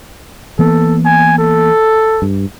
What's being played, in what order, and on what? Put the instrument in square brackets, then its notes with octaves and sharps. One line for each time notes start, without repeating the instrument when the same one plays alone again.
[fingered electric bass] E3 A#3 B3 [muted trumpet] A4
[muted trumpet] G#5
A4
[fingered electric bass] G2